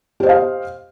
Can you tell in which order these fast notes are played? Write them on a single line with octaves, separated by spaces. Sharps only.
G4 C5 D#5 F5